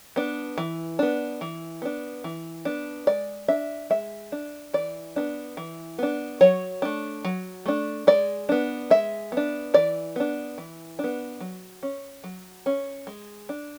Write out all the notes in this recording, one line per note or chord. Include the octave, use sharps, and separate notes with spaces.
B3 D4
E3
B3 D4
E3
B3 D4
E3
B3 D4
G#3 D5
D4 E5
G#3 E5
D4
E3 D5
B3 D4
E3
B3 D4
F#3 C#5
A3 D4
F#3
A3 D4
G#3 D5
B3 D4
G#3 E5
B3 D4
E3 D5
B3 D4
E3
D4
B3
F#3
C#4
F#3
C#4
G#3
D4